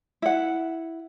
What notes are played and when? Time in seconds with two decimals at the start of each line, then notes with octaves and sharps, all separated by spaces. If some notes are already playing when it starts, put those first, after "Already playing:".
0.22 E4 F#5